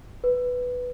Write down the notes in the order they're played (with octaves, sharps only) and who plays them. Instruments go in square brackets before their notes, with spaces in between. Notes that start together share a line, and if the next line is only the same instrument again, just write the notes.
[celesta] B4